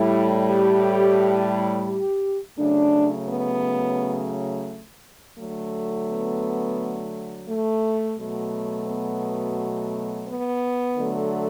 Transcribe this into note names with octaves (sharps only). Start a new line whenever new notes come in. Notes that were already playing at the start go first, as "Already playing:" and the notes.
Already playing: A2 G3 E4
G4
G4
C#3 F#3 A3 D4
B3
D3 F#3 A3
B3
A3
B2 F#3 A3
B3
B3
D3 F#3 A3